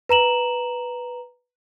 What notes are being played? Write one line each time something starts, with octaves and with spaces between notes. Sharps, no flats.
B4 A#5 E7 F#7